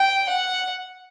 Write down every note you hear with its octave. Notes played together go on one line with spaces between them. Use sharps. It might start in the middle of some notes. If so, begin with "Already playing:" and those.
Already playing: G5
F#5